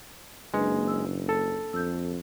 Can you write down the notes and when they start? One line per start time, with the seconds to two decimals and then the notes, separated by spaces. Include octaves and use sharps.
0.54 F#1 G#3 A#3 D4 B4
0.88 E6
1.29 A4
1.73 F2 E6 G6